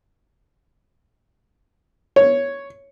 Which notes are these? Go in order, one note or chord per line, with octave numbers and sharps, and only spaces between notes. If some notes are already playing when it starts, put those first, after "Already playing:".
C#5